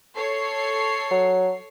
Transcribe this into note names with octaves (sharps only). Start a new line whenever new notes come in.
A4 C#5 C7
F#3